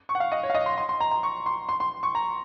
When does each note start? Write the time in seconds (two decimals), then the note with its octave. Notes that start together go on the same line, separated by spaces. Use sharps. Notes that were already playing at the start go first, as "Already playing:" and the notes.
0.09 C#6
0.15 F#5
0.20 F5
0.32 D#5
0.43 C#5
0.50 F5
0.55 D#5
0.66 C6
0.78 C6
0.89 C6
1.00 A#5
1.11 A#5
1.23 C#6
1.46 C6
1.69 C6
1.80 C6
2.03 C#6
2.15 A#5